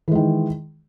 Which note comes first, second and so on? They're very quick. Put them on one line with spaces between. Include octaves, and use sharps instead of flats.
E3 G#3 D#3